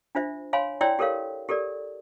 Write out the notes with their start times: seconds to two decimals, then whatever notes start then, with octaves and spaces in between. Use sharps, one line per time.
0.15 D4 F4 C5 E5
0.53 C#5 F5 G#5 B5 C6
0.81 E4 C#5 D5 G5 C6 E6
0.99 G4 A4 A#4 C#5 F5
1.49 G4 A4 A#4 D5